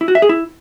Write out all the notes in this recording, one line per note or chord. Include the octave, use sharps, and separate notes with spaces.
E4
F#4
E5
G#4
E4